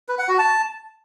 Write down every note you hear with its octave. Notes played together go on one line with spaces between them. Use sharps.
B4
F#5
F#4
A5